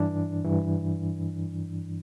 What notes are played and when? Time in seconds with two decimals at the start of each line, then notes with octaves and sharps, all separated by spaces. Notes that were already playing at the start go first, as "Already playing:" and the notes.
Already playing: G2 E3 D4
0.44 G2 E3